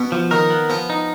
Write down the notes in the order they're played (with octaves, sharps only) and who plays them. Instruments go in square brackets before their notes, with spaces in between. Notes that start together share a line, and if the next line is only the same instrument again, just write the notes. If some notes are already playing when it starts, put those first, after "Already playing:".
Already playing: [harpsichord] B2 B3
[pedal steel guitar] F3
[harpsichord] D#3 D#4 [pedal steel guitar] A#4
[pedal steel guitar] B3
[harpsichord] F3 F4 [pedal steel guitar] B3
[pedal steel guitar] D#4